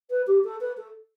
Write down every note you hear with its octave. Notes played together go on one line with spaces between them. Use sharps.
B4
G4
A4
B4
A4